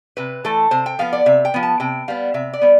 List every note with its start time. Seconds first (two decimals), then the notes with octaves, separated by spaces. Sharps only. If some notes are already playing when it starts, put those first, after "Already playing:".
0.17 C3 B4
0.45 E3 A3 A4
0.71 C3 C5
0.86 G5
0.99 F3 B3 F5
1.13 D5
1.26 C3 E5
1.45 G5
1.54 F3 B3
1.63 A5
1.80 C3 G5
2.08 G3 B3 F5
2.34 C3 E5
2.53 D5
2.61 G3 B3